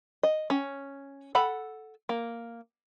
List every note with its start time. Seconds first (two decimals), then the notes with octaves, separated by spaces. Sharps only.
0.23 D#5
0.50 C#4
1.35 A4 F#5 B5
2.09 A#3